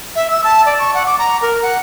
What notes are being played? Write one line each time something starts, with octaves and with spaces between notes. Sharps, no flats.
E5
E6
A5
D5
C#6
F#5
D6
A#5
A#4
F#5